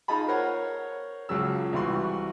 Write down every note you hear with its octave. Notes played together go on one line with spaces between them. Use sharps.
D#4 F4 G#4 D#5 A5 B5
A#4 C5 C#5 F#5
C#2 C#3 F3 F#3 G#4 E6
C2 E3 G3 F#4 C6